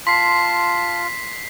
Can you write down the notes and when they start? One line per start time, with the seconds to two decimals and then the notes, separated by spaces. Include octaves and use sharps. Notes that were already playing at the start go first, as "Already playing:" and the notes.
0.07 F4 A5 C6 B6 C7